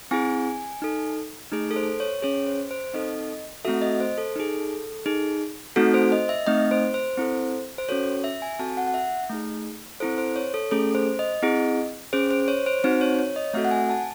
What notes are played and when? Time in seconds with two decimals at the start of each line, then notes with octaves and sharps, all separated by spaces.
0.11 C4 E4 G#4 G#5
0.82 D#4 A4
1.52 A3 D#4 G#4
1.71 A4
1.76 C5
2.00 C#5
2.22 C#4 G#4 C#5
2.46 C5
2.71 C5
2.94 C4 D#4 A4 D#5
3.64 A3 C4 F#4 A4 E5
3.82 D#5
4.00 C5
4.18 A4
4.36 D#4 G#4
5.06 D#4 G#4
5.76 A3 C4 D#4 F#4 A4
5.94 C5
6.12 D#5
6.29 E5
6.47 A3 C4 D#4 D#5
6.71 C5
6.94 C5
7.17 C4 E4 A4
7.78 C5
7.89 C#4 F#4 A4 C#5
8.24 E5
8.42 G#5
8.59 C4 F#4 A4 A5
8.77 F#5
8.87 F#5
8.94 E5
9.29 A3 D#4 G#4
10.00 C4 E4 A4 C5
10.18 C5
10.36 C#5
10.54 A4
10.71 A3 C#4 G#4 A4
10.95 C5
11.19 D#5
11.43 C4 E4 G#4
12.13 C#4 G#4 C5
12.31 C5
12.48 C#5
12.66 C5
12.84 C4 D#4 F#4 C5
13.01 C#5
13.19 C#5
13.36 D#5
13.54 A3 C4 F#4 A4 E5
13.65 F#5
13.71 G#5
13.90 A5